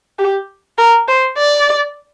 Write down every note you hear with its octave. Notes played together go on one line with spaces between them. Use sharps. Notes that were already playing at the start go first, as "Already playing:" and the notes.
G4
A#4
C5
D5